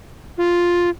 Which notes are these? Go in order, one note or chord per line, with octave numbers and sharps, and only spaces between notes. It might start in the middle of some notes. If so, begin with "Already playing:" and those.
F4